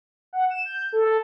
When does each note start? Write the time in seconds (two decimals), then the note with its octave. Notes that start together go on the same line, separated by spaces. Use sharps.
0.33 F#5
0.50 E7
0.65 G6
0.92 A4
1.05 A4